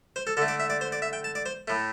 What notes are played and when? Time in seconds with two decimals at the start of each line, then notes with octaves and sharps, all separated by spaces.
0.16 C5
0.27 A4
0.37 D3 A3 A4
0.48 D5
0.60 E5
0.70 D5
0.81 C5
0.92 D5
1.02 E5
1.13 G5
1.24 A5
1.35 D5
1.46 C5
1.68 A2 A3